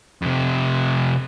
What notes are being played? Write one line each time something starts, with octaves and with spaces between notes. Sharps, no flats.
F2 C3